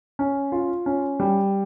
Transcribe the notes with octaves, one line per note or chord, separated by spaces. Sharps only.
C#4
F4
C#4
G3